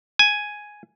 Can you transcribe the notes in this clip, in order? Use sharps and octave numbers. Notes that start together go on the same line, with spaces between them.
G#5